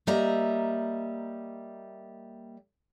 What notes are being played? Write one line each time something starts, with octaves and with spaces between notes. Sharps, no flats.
G3 A#3 D#5 E5 A#5